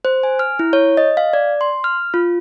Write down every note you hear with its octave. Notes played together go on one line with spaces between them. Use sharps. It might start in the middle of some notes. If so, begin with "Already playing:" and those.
C5
G#5
F6
E4
C#5
D#5
F5
D5
C6
F6
F4